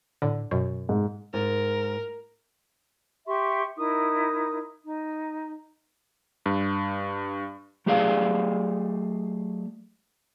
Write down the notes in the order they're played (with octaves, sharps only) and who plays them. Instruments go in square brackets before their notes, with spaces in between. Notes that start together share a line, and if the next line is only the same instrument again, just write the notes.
[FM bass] A2 [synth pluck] D3
[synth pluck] F#2 [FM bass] B2
[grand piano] G#2
[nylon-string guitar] G#2 [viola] A#4
[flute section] G4 E5 C6 C#6
D#4 E4 A#4 D#6
D#4
[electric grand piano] G2
[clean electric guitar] F#3 A3 G4 G#4 D5 F5